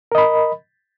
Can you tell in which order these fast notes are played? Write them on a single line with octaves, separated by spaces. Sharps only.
A#4 D#5 B5